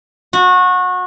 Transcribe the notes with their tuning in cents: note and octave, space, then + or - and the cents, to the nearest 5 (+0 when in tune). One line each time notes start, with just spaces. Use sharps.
F#4 -25